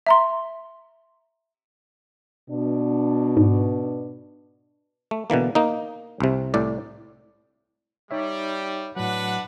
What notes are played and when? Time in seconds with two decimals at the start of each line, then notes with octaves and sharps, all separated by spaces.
0.07 E5 A#5 C6
2.50 B2 D4
3.37 G#2
5.11 A3
5.30 B2 D3 E3 A#3
5.55 A#3 D#4
6.20 C2 C3
6.54 C2 A2 D5
8.11 G3 D#4 C#5 E5
8.96 A2 F#3 D4 B4 F#5